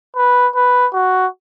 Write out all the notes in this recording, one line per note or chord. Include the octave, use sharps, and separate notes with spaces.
B4
B4
F#4